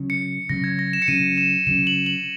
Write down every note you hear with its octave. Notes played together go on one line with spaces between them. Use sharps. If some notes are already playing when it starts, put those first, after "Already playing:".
Already playing: C#3 F#3 C#4
C#7
C#3 F#3 C#4 A#6
G#6
A#6
E7
C#7
C#3 F#3 C#4 D#7
E7
C#3 F#3 C#4 E7
F#7
F#7